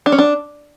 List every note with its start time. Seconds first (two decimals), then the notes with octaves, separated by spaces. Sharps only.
0.06 D4
0.12 C#4
0.18 D4